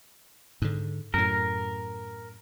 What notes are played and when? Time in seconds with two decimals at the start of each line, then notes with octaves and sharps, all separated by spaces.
0.62 G#2 D3
1.14 F#2 A2 A#4